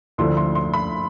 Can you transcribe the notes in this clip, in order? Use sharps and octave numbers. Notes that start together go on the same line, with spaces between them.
D2 D3 F3 A3 E4 C6
C6
C6
B5